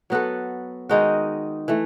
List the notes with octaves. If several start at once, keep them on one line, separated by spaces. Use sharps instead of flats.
F#3 B3 F#4 A4
D#3 G#3 D#4 F#4
E3 A3